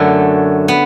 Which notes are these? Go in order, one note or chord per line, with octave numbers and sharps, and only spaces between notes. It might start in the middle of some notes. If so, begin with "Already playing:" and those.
Already playing: F#2 D3 F#3 A3
B3